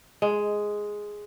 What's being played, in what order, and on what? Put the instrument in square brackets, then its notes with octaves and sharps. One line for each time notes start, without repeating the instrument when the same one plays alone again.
[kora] G#3